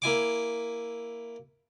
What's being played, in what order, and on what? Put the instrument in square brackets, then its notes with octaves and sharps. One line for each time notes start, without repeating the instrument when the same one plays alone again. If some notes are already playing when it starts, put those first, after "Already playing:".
[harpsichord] A#3 E4 G#5 D6